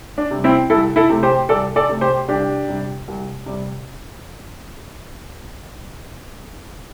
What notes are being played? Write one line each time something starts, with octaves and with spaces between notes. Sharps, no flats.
D4
C3 G3
C4 E4
C2 E4 A4
E4 A4
C3 A3
G4 C5
C2 A4 D5
A4 D5
C3 A3
G4 C5
C2 D4 G4
C3 G3
C2
C3 G3